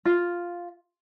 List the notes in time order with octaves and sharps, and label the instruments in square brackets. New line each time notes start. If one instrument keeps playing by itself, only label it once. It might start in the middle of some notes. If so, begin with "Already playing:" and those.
[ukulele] F4